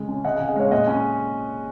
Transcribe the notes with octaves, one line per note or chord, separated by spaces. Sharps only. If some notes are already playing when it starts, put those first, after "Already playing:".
Already playing: C#3 G#3
C#4
C#3 D#5 F#5
C#3 F5 G#5
D#5 F#5
G#3 C#5 F5
A#2 D#5 F#5
C#4